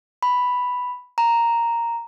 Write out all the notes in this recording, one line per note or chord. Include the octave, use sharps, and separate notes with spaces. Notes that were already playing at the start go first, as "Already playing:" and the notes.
B5
A#5